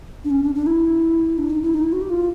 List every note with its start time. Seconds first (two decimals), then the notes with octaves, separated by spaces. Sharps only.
0.24 D4
0.30 C#4
0.43 D4
0.54 D4
0.66 E4
1.37 D4
1.50 D#4
1.62 E4
1.74 D#4
1.83 E4
1.92 F#4
2.01 G4
2.09 F4